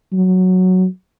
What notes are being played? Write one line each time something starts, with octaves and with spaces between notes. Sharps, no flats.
F#3